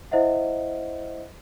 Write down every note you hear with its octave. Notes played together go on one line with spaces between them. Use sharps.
E4 C5 D#5 E5 F#5